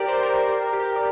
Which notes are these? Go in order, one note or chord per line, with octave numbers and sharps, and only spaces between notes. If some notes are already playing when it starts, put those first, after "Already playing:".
Already playing: G4 A#4 D5
C5
A#4
A#4
A#4
A#4
G4
A#4
D5